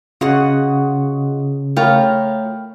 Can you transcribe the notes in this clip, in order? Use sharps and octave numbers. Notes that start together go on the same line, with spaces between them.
C#3 F4 F#4 G#4 D#5 F#5 C#6
A3 F4 A#4 C#5 G5 B5